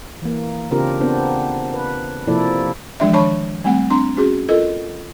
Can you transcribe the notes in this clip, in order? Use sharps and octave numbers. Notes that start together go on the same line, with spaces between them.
E3 A#3
C#3 C4 D4 F4 G4 A#4
B3 C4 D4 C5
B4
C3 F3 A#3 E4 A4 D5
E3 F3 G#3 D4 D5 E5
D#3 D4 C#5 A5 B5 C#6
G3 A3 C4 F#5
C4 D4 A#5 C6
C#4 F#4 G#4
F4 A4 A#4 D#5